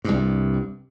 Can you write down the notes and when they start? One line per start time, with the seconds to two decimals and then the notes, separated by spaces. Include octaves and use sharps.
0.04 C2 G2